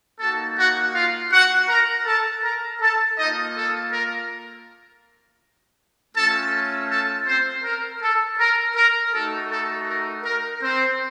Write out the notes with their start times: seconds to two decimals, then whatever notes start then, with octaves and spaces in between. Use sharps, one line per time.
0.20 A#3 D#4 F#4 A4 A5
0.58 F#4 F#5
0.94 F4 F5
1.32 F#4 F#5
1.68 A#4 A#5
2.06 A4 A5
2.43 A#4 A#5
2.80 A4 A5
3.18 A#3 D#4 F4 D#5
3.55 A4
3.92 A#4
6.15 A3 C#4 F4 A4 A5
6.90 A4 A5
7.27 C4 C5
7.63 A#4
8.02 A4
8.38 A#4
8.75 A#4
9.13 A3 D#4 F#4 A4
9.50 A4
9.87 A#4
10.24 A#4
10.62 C4 C5